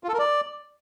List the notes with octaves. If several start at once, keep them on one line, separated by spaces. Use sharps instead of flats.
F4
A4
A#4
D5